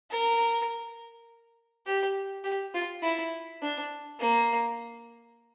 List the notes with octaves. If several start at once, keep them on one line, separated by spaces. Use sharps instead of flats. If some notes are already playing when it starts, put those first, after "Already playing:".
A#4
G4
G4
F4
E4
D4
A#3